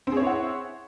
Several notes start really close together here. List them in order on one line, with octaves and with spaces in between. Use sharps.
C4 G#4 C#5 E4 F#5